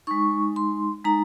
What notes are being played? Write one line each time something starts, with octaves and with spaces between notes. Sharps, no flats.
G#3 D#4 C#6
C6
G#3 D#4 A#5